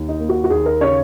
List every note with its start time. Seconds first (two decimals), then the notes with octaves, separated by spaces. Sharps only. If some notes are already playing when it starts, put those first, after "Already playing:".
Already playing: D#2
0.09 D#4
0.19 A#3
0.29 F#4
0.44 F#4
0.50 D#2 G#4
0.66 A#4
0.81 C#3 C#5